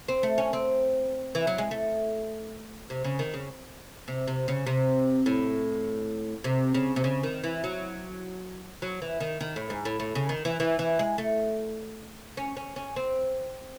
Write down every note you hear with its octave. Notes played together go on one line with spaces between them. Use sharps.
C4
A3
C#4
C4
E3
F#3
G#3
A3
C3
C#3
D#3
C#3
C3
C3
C#3
C3
A2
C3
C#3
C3
C#3
D#3
E3
F#3
F#3
E3
D#3
D#3
A2
G#2
A2
A2
C#3
D#3
E3
E3
E3
G#3
A3
C#4
C#4
C#4
C4